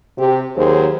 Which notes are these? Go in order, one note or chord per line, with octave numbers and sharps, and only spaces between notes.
C3 G4
D#2 F#3 G#4 C5